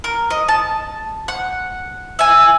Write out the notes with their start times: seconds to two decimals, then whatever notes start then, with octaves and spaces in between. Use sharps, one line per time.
0.04 A#4
0.30 D#5
0.48 A5
1.28 F#5
2.19 E5 G#5